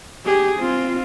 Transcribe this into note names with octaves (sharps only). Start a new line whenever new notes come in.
G4 G#4
C4 F4